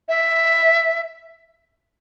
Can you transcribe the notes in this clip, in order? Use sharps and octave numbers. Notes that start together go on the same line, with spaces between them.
E5